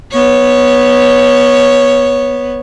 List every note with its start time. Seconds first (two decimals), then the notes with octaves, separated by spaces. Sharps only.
0.11 B3 C#5